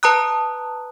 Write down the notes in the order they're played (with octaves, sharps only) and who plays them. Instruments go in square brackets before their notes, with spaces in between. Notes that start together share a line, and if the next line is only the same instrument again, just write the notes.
[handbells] B4 A5 A#5 D#6 F#6